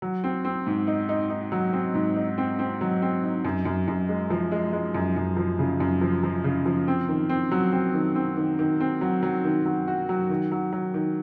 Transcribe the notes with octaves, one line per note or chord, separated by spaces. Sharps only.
F#3
C4
C4
G#2
D#4
D#4
D#4
F#3
C4
G#2
D#4
C4
C4
F#3
C4
D#4
F#2
F#2
F#2
G#3
F3
G#3
G#3
F#2
F#2
F3
C#3
F#2
F3
F3
C#3
F3
C4
D#3
C4
F#3
C4
D#3
C4
D#3
D#3
C4
F#3
F#3
D#3
F#3
F#4
F#3
D#3
F#3
F#3
D#3